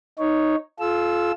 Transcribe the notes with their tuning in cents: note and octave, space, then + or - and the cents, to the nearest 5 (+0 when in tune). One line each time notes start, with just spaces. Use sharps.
D#4 +0 C#5 +0
F4 +0 A4 -40 E6 +0